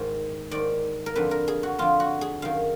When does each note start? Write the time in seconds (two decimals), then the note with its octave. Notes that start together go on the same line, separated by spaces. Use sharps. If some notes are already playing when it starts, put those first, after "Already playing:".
Already playing: G#2 D#3
0.51 G#2 D#3 D5
1.06 A#4
1.16 F2 D3 B4
1.31 A#4
1.48 G#4
1.63 F#4
1.78 F2 D3 F4
2.00 F#4
2.21 G#4
2.42 F#2 D#3 F5